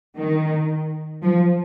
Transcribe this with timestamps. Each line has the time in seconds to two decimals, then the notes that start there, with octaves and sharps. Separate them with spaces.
0.17 D#3
1.22 F3